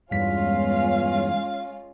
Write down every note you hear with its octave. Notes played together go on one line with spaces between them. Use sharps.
E2 G2 G3 G#3 C#4 F4 F5 B6